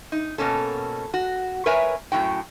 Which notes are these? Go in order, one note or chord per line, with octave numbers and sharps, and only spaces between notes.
D#4
B2 A#3 C#4 A4
F#4
A#4 B4 C#5 E5 G#5 A#5
F#2 A2 E3 F#4 G5